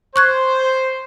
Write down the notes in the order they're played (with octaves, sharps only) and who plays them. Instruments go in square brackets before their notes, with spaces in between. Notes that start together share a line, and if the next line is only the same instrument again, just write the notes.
[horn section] C5 [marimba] C#6 F#6 G#6